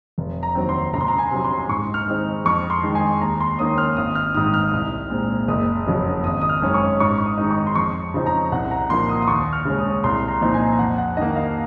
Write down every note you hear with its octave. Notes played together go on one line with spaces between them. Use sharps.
F1
A#5
D#2 D#3 F#3 C4
C6
C#2 A#5
C6
A#5
G#5
C3 F#3
C6
G#2 C#6
F6
D#3 G#3 C4 D#4
F2 C#6
C6
D#3 G#3
G#5
D#2 A#5
C6
D#3 A#3 C#4 D#6
F6
G#1 D#6
F6
G#2 D#3 D#6
F6
C2
A#2 G#3 C4
F#1 D#6
F2 C#3 F#3
G#1 D#6
D#6
F6
F#2 D#3 G#3 C#4
C#6
G#2 C#6
C#6
D#6
D#3 G#3 D#4
C#6
C6
F2 C#6
C#3 F3 C4 D#4
A#5
C2 F#5
A#5
A#2 F3 A#3 D#4 C6
D#6
D#6
D#2 C#6
F6
C#3 G#3 C#4
D#6
C2 C6
A#5
A#2 F3 C4 D#4
G#5
F2 F#5
F#5
D#3 A#3 D#5
F5